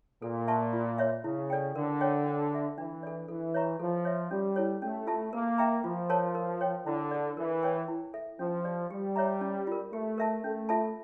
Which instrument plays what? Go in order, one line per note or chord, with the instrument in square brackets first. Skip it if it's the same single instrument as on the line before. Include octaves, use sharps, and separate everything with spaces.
[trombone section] A#2 [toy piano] A4
[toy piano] E5 A5 C#6
F4
C#5 E5
[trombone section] C#3 [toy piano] E4
[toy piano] A4 D5 G5
[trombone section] D3 [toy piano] A#4
[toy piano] C#5 G5
D4
A4 E5
[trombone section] E3 [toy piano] D4
[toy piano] A4 D5
[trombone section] E3 [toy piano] A4
[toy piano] C#5 E5 A#5 C#6
[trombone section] F3 [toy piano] A4
[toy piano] C#5 E5
[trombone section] G3 [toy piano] C#4
[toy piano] E4 A4 C#5
[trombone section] A3 [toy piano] C#4
[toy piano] F4 A4 E5 A5
[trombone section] A#3 [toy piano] A#4
[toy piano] E5 G5 A#5
[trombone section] F3 [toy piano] F4
[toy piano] A#4 C#5 F5 A5
A#4
C#5 G5
[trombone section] D3 [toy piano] E4
[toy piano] A4 D5
[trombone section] E3 [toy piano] A#4
[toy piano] C#5 G5 C#6
E4
A4 E5
[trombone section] F3 [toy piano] C#4
[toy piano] G4 D5
[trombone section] G3 [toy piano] G4
[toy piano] C#5 E5 A#5
C#4
F4 A#4
[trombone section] A3 [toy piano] G4
[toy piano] A#4 E5 A5
[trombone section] A3 [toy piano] C#4
[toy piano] F4 A4 E5 A5